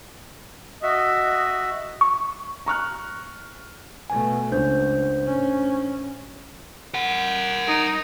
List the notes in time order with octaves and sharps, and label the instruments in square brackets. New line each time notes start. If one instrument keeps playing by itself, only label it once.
[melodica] F#4 E5 [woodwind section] D#5
[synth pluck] C#6
[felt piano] A#5 C#6 F6 F#6
[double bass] B2 A3 [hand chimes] G#5
[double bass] C#2 [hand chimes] D4 C5 G6
[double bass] A1 C#4
[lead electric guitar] A#4 F#5
[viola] D#4